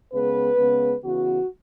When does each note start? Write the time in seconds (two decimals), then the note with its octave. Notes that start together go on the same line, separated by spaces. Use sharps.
0.13 C#3 G#3 B3 B4
0.58 C#3 G#3 B3
1.04 C#3 E3 B3 F#4